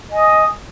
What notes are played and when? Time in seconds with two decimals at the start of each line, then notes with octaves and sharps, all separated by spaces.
0.10 D#5
0.13 G#5
0.17 D#6